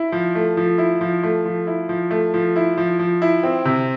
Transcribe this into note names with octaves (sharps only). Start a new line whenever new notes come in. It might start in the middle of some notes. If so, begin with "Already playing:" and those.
Already playing: E4
F3
A3
F3
E4
F3
A3
F3
E4
F3
A3
F3
E4
F3
F3
E4
C4
C3